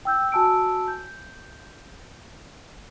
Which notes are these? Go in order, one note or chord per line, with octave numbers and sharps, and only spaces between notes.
G5 E6 G6
F#4 G#5 A5 E6 D7
G6